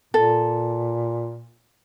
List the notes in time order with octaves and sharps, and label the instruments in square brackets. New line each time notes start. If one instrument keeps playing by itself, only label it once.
[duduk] A#2 [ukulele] A4